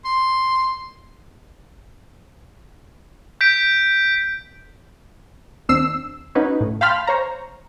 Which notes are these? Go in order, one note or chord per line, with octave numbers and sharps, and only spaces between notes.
C6
G6 B6 D7
D#2 C4 D4 E6 C7
C#4 D#4 F#4 B4 C#5
A2
F5 G5 A5 B5 C6 F6
C5 C#5 A#5